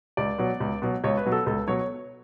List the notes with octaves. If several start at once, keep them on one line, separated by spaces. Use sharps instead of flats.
C#2 D5
B2 F#3
C#2
B2 F#3
C#2 C#5
B4
B2 F#3
A4
C#2 A4
B2 F#3 C#5